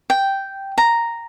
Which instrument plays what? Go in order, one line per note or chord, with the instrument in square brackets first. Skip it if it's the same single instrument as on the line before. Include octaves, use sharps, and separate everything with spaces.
[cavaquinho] G5
A#5